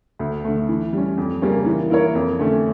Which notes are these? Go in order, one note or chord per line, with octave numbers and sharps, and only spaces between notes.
D2
D3 A3
E3
G3 C#4
F2
C#3 G3 A#3 C#4
E3
A#3 E4 A#4 C#5
F2
D3 A3 C#4